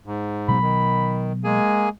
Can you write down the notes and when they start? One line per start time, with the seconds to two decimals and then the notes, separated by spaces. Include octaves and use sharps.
0.06 G#2
0.48 B2 F#3 B3 B5
0.62 D#3
1.44 G#3 A#3 G#4 G#5